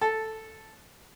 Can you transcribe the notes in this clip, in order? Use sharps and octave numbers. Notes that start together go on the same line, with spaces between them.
A4